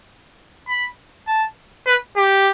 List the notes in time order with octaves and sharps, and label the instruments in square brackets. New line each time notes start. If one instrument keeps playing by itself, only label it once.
[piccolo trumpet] B5
A5
B4
G4